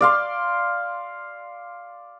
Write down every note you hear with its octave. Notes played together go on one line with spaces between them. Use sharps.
D5 F5 C6